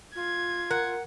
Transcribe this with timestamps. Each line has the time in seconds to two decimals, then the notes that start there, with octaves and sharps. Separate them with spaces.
0.16 F4 G#6
0.71 A#4 F#5